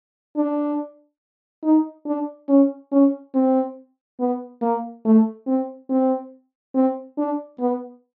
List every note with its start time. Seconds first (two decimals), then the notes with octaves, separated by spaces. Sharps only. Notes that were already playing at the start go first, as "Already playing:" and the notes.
0.37 D4
1.64 D#4
2.06 D4
2.49 C#4
2.92 C#4
3.35 C4
4.20 B3
4.62 A#3
5.05 A3
5.47 C4
5.90 C4
6.75 C4
7.18 D4
7.60 B3